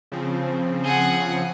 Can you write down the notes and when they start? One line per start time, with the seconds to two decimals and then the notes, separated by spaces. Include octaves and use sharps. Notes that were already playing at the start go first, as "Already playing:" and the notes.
0.12 C#3 F3 C4
0.84 G#4 F#5